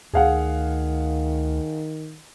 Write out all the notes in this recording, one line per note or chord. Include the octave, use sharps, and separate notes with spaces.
D2 D#3 G#4 F5 F#5